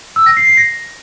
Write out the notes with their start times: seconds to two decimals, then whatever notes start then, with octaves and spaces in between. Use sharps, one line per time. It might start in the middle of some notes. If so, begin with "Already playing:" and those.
0.16 E6
0.26 A#6
0.37 C7
0.47 C7
0.57 A#6